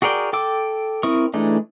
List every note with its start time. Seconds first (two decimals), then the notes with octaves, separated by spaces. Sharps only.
0.02 F#4 G#4 A#4 D5 G5
0.33 A4 G5 D6 E6
1.03 C4 E4 A#4 C#6 D#6
1.34 E3 G#3 A3 D4 D#4